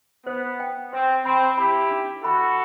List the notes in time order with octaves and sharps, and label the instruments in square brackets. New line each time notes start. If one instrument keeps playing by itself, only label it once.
[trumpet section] B3 [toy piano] C5
[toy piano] G5
[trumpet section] C4 [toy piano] C5
[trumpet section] C4 [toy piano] B5
[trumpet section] E4 G4 [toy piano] B5
[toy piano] D4
[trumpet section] F#4 A4 [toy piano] B5